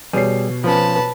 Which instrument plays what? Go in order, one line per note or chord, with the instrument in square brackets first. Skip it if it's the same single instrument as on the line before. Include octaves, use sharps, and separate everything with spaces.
[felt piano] B2 C#5 C7 [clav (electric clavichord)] G3 G#4
[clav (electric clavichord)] F3 C#4 [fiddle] B4 A5